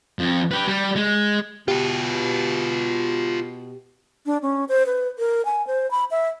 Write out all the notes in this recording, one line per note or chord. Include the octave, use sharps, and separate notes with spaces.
F2
G4 B4
G3
G#3
B2 F4 G4 B4
D4
C#4
C5
B4
A#4
G#5
C5
B5
E5